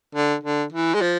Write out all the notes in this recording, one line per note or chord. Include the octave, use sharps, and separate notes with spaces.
D3
D3
E3
G#3
F3